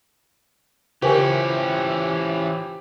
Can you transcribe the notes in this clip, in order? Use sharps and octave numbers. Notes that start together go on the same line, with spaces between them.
C#3 E3 C#4 F4 G4 A#4 C5 G#5